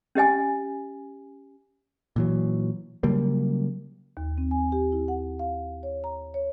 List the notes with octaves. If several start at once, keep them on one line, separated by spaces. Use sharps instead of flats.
C#4 G4 D#5 G#5
A#2 E3 F#3
C#3 F#3 G3 A#3
D#2
C4
G#5
G4
E4
F#5
F5
C#5
A#5
C#5